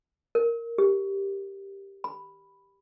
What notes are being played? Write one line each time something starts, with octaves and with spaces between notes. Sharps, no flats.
A#4
G4
B5